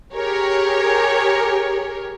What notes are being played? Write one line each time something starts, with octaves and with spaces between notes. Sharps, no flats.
G4 G#4 A#4 C#5